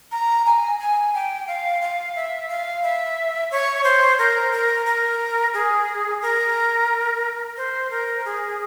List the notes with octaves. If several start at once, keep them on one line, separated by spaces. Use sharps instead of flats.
A#5
G#5
G#5
G5
F5
F5
E5
F5
E5
C#5
C5
A#4
A#4
A#4
G#4
A#4
C5
A#4
G#4